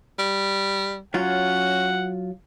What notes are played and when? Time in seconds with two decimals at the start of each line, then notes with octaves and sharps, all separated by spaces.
0.18 G3
1.14 F#3 C#4 F4 F#5